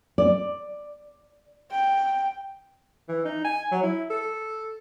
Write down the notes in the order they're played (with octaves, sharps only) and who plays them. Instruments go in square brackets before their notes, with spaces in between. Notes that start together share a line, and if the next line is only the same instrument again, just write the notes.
[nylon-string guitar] D5
[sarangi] G5
[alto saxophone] E3
D#4
G#5
F#3
E4
A4